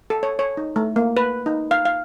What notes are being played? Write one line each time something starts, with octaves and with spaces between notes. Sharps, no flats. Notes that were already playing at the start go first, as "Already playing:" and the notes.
A4
C#5
C#5
D#4
A3
A#3
B4
D#4
F5
F5